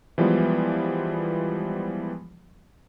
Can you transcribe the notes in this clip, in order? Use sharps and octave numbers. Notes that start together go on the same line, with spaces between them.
E3 F3 G3 G#3 B3